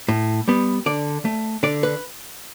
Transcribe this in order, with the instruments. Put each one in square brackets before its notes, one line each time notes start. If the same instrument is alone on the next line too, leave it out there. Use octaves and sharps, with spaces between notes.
[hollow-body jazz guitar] A2
G3 B3
D3 D5
A3
D3 D5
B4